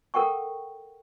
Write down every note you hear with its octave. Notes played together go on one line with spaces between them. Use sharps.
A4 A#4 F#5 G5 C#6